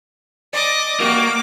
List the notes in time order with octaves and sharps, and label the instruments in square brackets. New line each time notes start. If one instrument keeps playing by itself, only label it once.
[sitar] D5 [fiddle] D#5 D6
[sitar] G3 F#4 [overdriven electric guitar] A#3 [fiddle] D6